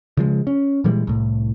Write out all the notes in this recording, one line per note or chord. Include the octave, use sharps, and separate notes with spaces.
C#3 F3 G#3
C#4
A#2 E3 G3 G#3
C2 A2